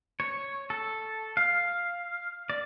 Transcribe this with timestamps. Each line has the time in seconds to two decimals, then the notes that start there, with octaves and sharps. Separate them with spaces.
0.20 C#5
0.70 A4
1.37 F5
2.50 D5